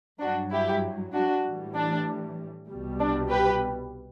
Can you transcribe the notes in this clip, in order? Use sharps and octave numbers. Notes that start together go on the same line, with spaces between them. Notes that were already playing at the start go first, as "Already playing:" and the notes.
G2 F#3 D4 F#4
E4 G4
D4 F#4
A2 E3 G3
D4
C2 B2 G3
D4
G4 B4